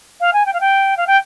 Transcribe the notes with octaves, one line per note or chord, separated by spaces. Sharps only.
F5
G#5
G5
F5
G5
F5
G5